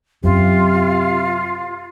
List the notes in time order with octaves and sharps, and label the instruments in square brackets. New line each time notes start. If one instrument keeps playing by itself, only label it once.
[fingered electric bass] F#2 [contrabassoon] C3 [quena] F4